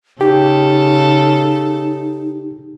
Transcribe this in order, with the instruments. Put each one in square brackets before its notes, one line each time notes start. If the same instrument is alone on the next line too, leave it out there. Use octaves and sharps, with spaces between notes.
[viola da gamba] C#3 A4 [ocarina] D#4 [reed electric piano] G4